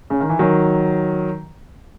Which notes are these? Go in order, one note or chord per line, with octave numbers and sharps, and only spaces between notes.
C#3
D#3
E3
D#3 F#3